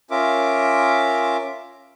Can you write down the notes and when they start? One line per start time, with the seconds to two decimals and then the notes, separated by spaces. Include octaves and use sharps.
0.11 C#4 F4 A#4 E5 D6